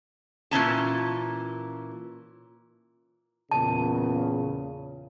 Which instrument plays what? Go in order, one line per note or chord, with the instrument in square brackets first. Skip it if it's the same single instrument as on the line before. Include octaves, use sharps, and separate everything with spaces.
[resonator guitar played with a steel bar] A#2 E3 C#4 A5
[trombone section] E2 A#2 C#3 [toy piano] A5